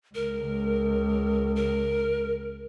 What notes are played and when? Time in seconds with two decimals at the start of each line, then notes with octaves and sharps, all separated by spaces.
0.15 C#2 A#4
1.56 A#4